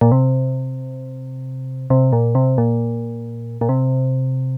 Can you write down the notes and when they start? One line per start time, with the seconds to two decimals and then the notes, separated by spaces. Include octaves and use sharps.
0.01 A#2
0.12 C3
1.90 C3
2.13 A#2
2.35 C3
2.58 A#2
3.61 A#2
3.69 C3